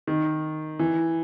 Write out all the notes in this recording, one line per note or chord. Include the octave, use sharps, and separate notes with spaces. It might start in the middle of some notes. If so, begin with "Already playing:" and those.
D#3
E3